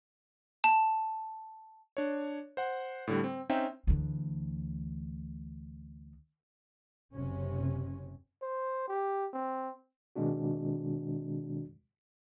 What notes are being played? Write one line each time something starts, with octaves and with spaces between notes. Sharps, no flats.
A5
D4 C#5
C5 F#5
A2 D3 G3
C4
C4 C#4 D#4 E5 G5
D2 E3
F#1 C3 C#4
C5
G4
C4
B2 D#3 G#3 C4 D4 F#4